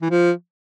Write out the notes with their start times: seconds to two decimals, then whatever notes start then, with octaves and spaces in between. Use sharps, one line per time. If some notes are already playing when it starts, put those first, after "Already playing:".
0.02 E3
0.10 F3